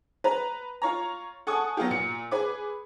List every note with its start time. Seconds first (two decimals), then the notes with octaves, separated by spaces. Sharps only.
0.24 B4 A#5
0.82 F4 C#5 A#5
1.47 A4 F#5 G#5 C#6 D#6
1.77 F#3 B3 F4 G4
1.91 A#2 C#7
2.31 G#4 B4 D6